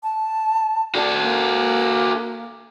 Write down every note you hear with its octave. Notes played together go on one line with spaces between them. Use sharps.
A5
F#4 A4 D5
A#3